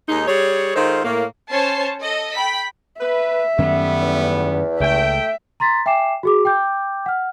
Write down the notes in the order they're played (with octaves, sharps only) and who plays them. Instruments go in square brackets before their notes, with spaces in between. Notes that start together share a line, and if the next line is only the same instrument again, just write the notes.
[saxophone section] D#2 G#3 D#4
G3 G#4 C#5
D#3 G#3 F4 A4 C5
A2 A#3
[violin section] C#4 C5 C#5 A5 C7
A4 D#5
G5 B5 B6
[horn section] B4 [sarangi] E5
[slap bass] F#2 D#3 C#4 [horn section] G3 A3 B3
[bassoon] E2
[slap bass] C#2 C#3 [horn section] A3 G5 [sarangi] E5
[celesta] A#5 C6 A6 B6
E5 G5 G#5 D6 C7 E7
F#4 G#4 D6
G5 D6 G6
F#5 F6